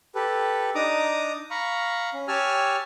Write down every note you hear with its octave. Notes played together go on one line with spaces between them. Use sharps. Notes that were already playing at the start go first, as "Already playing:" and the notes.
G4 A4 B4
D4 D#4 A#5 D6 D#6
F5 A#5 B5 C#6
C#4
G4 C#5 G#5 A5 E6 F6